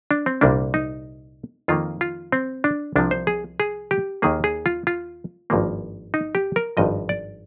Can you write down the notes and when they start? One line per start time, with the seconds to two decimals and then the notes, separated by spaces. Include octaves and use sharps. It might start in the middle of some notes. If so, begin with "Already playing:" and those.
0.11 D4
0.26 C4
0.41 C2 A#2 G3 A#3 D4
0.74 D#4
1.68 F2 D#3 A#3 F4
2.01 F4
2.32 C4
2.64 D4
2.96 C2 C3 F3 D4
3.11 C5
3.27 G#4
3.60 G#4
3.91 G4
4.22 D#2 D#3 A#3 G#4
4.44 G#4
4.66 F4
4.87 F4
5.50 G#1 G2 F3 A#3
6.14 D#4
6.35 G4
6.56 A#4
6.77 G#1 G2 F3 D#5
7.09 D5